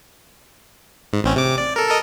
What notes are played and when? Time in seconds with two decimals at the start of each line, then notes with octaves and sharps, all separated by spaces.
1.13 G#2
1.24 A1 C4 C#4
1.36 C3 D6
1.58 D5
1.76 A4 A#4
1.88 A4 A#4 D#5